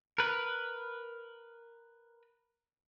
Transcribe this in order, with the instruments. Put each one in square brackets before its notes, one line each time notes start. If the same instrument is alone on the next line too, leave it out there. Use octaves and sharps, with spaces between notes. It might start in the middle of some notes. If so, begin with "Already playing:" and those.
[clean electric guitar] A#4 B4